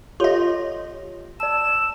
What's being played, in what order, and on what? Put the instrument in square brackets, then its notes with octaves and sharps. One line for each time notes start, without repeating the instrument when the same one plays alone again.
[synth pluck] F4 D#5 [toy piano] G4 A4 C#5
[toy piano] D5 A5 [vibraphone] E6 [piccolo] E7